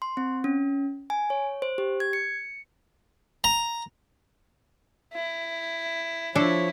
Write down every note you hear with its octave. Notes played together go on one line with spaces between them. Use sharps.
C6
C4
C#4
G#5
C#5
C5
G4
G#6
C#7
A#5
E4
F3 D4 E4 A4 C#5